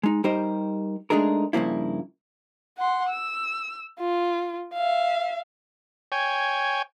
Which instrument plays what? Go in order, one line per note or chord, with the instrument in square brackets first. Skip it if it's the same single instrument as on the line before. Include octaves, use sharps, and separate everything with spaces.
[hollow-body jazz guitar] G#3 D#4
G3 D#4 G4 A#4 C5 D#5
G#3 A3 D4 D#4 G#4 A#4
G2 C#3 F3 A#3 E4
[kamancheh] F#5 C6
E6
F4
E5 F5
[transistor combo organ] C#5 G5 G#5